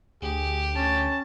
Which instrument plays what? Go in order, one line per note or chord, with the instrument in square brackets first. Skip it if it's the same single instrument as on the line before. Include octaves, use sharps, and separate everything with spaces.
[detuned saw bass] D2 [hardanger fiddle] G4 [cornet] G#4
[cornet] C#4 [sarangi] A5